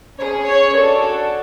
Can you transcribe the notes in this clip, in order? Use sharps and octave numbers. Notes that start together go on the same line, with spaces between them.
C#4 G#4 C#5
C#5
D4 F#4 A4